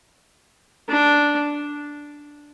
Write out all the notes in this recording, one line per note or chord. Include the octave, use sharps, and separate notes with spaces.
D4